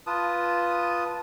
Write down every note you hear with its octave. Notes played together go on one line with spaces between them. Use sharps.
F4 B4 A5 D#6